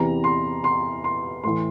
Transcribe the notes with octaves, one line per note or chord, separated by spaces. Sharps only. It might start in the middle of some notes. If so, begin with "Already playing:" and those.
Already playing: E2 C3 E3 A#5
C6
C6
C6
A2 E3 C6